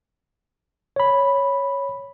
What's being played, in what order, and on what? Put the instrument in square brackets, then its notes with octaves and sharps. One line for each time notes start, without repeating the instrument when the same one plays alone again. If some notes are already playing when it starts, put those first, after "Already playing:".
[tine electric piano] C#5 B5